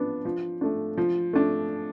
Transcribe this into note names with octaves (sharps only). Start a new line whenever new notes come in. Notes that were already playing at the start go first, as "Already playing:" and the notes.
Already playing: F3 B3 D4
F3
A3 D4
F3
A3 D4